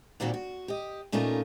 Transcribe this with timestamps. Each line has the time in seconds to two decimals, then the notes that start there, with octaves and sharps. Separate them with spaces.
0.20 A#2 D#3 G3 C4 F#4
0.34 F#4
0.68 G4 D#5
1.12 A#2 A3 C#4 D#4 F4 A#4